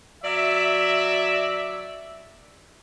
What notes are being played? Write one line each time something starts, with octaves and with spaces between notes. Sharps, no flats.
F#3 D5 E5